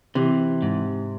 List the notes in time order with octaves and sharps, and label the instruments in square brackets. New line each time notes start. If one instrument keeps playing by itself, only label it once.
[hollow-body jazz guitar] C3 [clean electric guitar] E3
[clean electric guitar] G#2